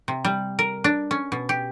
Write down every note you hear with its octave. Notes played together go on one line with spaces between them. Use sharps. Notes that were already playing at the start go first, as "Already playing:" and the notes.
C3
G3
A#4
D4
C#4
B2
G4